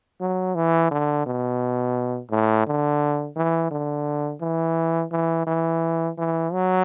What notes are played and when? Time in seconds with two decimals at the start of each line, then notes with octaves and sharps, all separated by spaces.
0.21 F#3
0.55 E3
0.91 D3
1.26 B2
2.31 A2
2.67 D3
3.36 E3
3.71 D3
4.41 E3
5.12 E3
5.47 E3
6.18 E3
6.53 F#3